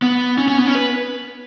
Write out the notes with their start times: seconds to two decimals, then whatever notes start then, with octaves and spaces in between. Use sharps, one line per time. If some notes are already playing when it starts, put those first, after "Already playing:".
0.02 B3
0.38 C#4
0.48 C#4
0.58 B3
0.66 C#4
0.75 B4